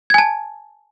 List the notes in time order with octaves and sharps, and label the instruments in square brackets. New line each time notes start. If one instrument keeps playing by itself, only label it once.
[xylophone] G#6
G#5
A5